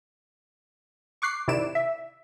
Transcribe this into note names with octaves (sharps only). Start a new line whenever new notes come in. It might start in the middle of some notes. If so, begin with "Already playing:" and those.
C#6 D6 F#6 C7
C3 D#3 E4 D5 D7 E7
E5